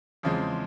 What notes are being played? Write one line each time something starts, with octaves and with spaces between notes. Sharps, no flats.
E2 C#3 F3 G#3 C4